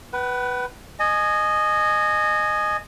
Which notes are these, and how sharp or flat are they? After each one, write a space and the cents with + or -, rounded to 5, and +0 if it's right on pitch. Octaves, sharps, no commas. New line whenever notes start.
B4 +0 F#5 +40
D#5 -20 G#5 +15